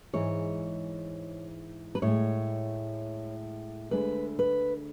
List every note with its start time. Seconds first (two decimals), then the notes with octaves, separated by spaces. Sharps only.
0.13 G#2 E3 G#3 C#5
1.95 B4
2.02 A2 G#3 C#5
3.91 D2 D3 G#3 B4
4.39 B4